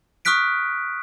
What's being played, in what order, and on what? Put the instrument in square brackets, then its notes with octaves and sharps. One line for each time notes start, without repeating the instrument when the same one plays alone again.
[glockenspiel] C#6 D#6 F6 F#6 B6 D7